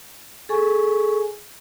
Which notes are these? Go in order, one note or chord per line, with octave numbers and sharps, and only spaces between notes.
G#4 A4 G#5 C#6